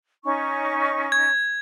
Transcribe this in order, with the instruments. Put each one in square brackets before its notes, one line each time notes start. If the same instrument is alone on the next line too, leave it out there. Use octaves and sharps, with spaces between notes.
[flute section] C#4 D#4 C#6
[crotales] G#6